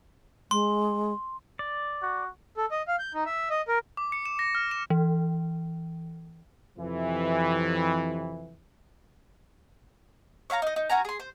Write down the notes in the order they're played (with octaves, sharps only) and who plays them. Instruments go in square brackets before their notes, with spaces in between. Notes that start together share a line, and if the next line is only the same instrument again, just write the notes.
[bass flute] G#3 [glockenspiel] C6
[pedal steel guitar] D5
[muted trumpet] F#4
[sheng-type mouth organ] A4
D#5
F5
G6
D#4
E5
D#5
A#4
[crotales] D6
C#7
E7
A#6
F6
E7
[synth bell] E3
[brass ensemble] F2 C3 E3
[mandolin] C#5 E5 F5 A#5
D#4 D#5
D#4
C#4 F#4 G#5 A#5
G#4 C6
C5